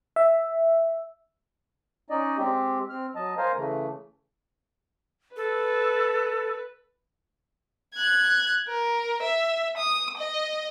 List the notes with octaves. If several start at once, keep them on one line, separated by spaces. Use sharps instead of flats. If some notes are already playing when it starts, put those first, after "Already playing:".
E5
C#4 D#4 D5 D#5
G#3 C4 G4
C4 F6
F#3 D#5 A5
A#4 C5 F5 G#5 A#5
C#3 E3 A3
A4 B4
F#6 G#6
A#4
E5
D#6
D#5